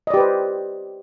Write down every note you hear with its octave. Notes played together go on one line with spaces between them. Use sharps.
G4 B4 C5 D5 D#5